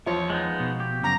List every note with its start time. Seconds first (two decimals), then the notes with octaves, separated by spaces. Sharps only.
0.06 E2 F3 F4 C#5
0.30 G#3 B3 D#4
0.60 B2
0.80 G4
1.03 F#2 C#3 A#5